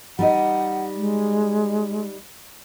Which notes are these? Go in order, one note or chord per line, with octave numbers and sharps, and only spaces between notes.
G3 D#4 D#5 F#5
G#3